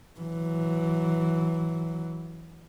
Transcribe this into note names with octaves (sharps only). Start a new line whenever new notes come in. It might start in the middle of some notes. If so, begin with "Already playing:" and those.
E3 F#3